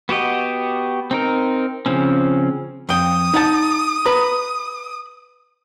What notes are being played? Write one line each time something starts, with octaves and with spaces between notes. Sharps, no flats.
B3 F#4 G4 D#5
C4 D#4 A#4
C#3 F3 C4 C#4
F2 G5 D#6
D#4 F#5 A5
B4 A#5